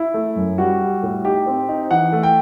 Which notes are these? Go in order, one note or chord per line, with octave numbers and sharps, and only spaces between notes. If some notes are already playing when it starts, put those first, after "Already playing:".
Already playing: E4
A3
F#2
G3 F#4
G3
A2
D#4 G4
C4
D#4
E3 F#5
A3
G5